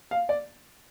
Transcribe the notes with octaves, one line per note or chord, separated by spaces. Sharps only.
F5
D5